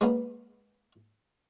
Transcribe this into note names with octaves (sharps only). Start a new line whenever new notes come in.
G#3 A#3 B3 C#4